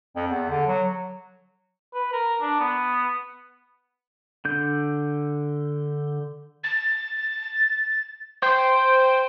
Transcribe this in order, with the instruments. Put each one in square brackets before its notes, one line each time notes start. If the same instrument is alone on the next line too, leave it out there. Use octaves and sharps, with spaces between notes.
[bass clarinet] F2
E2
D3
F#3
[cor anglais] B4
A#4
D4
B3
[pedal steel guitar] D3 G6
[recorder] A6
[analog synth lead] C5 [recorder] G5